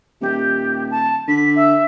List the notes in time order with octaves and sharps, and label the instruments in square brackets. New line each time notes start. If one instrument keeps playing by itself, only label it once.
[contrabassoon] D#1 [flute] G4
[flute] A5
[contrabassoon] D3 [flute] B6
[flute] E5